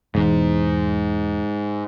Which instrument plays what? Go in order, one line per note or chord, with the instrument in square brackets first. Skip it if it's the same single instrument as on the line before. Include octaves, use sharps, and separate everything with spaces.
[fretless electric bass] E1 E2 [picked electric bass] G#2